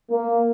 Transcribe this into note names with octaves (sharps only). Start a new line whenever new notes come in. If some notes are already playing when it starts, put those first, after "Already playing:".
A#3